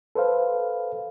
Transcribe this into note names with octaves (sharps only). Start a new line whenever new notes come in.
A4 B4 C5 F5